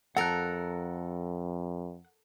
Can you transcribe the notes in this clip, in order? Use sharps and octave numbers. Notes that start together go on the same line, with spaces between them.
F2 A4 A#4 F#5 F#6